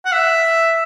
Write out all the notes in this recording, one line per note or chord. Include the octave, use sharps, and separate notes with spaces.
F#5
E5